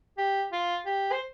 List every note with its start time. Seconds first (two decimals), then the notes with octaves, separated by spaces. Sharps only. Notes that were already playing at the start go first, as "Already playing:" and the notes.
0.18 G4
0.52 F4
0.86 G4
1.12 C5